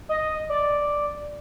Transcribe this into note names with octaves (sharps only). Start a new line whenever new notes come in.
D#5
D5